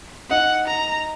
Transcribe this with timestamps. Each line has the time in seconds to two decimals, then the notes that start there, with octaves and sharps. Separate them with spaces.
0.30 D#4 F#5
0.67 A#5